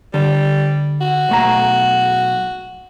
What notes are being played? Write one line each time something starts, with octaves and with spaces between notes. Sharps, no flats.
D3 G3
F#4
B1 A3 A#5